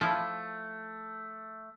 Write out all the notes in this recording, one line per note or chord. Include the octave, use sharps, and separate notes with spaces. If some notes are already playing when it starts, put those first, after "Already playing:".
F3 A3 E4